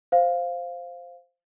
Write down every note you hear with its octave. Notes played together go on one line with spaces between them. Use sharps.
C5 F5